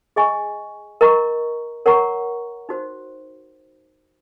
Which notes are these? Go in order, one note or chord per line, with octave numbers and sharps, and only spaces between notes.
G#4 D#5 G#5 C#6
A#4 D#5 A#5 C#6
A#4 C#5 F#5 A#5 C#6
D#4 F#4 C5